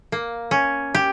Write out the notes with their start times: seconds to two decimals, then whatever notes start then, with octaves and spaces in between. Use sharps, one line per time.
0.12 A#3
0.51 C#4
0.95 G4